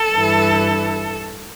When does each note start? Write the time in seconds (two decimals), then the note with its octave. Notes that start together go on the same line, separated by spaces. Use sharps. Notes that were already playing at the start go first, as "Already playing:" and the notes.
Already playing: A4
0.14 G2 E3